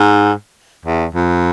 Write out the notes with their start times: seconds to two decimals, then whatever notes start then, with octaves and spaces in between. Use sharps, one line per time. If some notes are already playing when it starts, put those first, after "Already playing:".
Already playing: G#2
0.85 E2
1.15 F2